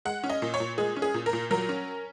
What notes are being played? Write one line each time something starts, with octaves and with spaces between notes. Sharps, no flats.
G#3 F#5
C#4
D#5
A#2
C#5
A#2
G#3 G#4
C#4
G#4
A#2
A#4
A#2
F#3 A#4
C#4